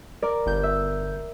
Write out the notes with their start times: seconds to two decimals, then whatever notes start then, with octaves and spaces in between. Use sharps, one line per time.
0.22 A#4 D5
0.46 G1 G6
0.63 E5